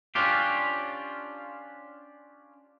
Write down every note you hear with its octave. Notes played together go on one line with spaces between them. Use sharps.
C#4 D4 F4 G4